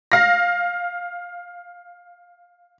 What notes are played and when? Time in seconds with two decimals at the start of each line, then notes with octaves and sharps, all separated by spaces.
0.12 F5 A#6